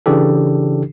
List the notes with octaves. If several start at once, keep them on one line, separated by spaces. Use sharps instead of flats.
C#3 E3 D4 G4 A4